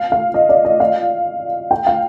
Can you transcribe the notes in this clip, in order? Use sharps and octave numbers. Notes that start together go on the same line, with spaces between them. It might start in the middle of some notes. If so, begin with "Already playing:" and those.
Already playing: F5
F5
D#5
D5
D#5
F5
G5
F5